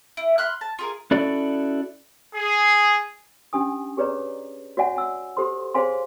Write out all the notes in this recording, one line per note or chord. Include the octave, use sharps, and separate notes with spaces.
E4
B5 C6 F6 F#6
A5
F4 G#4 A#4
C#4 E4 F#4 A4 D5
G#4
C#4 D4 G4 G#5 D#6
G4 G#4 B4 C#5 D5 A#5
F#4 C#5 D5 E5 F#5 G#5
G#5 E6
G4 A4 C5 C6
G#4 C5 C#5 F5 G#5 C6